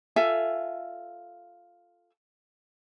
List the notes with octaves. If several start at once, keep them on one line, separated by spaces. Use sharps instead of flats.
F4 A4 E5 G#5